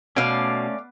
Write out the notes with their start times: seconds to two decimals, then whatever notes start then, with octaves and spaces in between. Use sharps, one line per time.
0.16 B2 A3 C#4 D5 F5